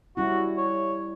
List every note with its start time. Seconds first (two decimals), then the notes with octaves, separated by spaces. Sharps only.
0.17 G3 C#4 E4 F#4
0.57 C#5